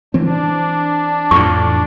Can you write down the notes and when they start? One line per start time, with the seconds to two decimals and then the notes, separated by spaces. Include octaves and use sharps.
0.14 E3 C4 D4
1.31 F2 A2 C#6